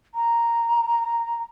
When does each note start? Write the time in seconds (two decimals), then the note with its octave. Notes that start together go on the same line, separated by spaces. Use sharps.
0.15 A#5